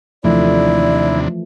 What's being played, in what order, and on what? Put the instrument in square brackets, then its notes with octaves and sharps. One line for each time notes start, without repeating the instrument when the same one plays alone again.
[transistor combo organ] D#2 C3 D4 [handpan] E3 F3 A3 [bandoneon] E4 [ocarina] D5